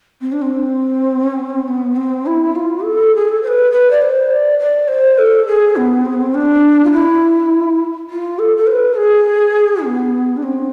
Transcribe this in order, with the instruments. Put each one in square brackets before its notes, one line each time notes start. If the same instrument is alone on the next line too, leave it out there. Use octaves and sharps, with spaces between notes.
[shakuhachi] C4
D4
C4
B3
C4
E4
F4
A4
G#4
A4
C5
B4
B4
D5
C5
D5
D5
C5
A4
G#4
B3
C4
B3
C4
D4
F4
E4
F4
A4
A4
C5
B4
G#4
B3
D4
C4